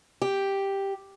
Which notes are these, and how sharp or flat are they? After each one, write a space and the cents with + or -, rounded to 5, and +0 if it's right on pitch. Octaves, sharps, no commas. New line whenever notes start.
G4 +0